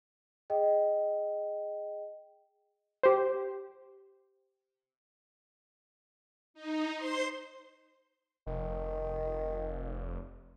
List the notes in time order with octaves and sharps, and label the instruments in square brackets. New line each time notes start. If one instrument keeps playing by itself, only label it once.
[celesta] G#4 D#5 G5
[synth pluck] G4 C5
[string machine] D#4
C5 C6 C7
[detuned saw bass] F1 [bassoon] D#3